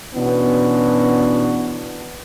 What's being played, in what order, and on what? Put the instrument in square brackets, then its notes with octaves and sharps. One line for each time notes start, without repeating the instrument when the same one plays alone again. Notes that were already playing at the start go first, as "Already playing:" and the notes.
[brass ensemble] B2 E3 B3 C#4 D4 F#4